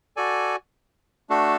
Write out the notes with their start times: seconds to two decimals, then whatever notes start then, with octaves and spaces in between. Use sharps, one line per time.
0.16 F#4 A4 D5 G#5
1.30 A3 D4 F#4 A4